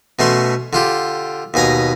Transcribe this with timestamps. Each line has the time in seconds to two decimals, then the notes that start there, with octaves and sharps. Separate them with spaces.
0.19 B2 A3 C#4 C6
0.73 D3 F4 G4
1.54 D#2 B2 G#5 A#5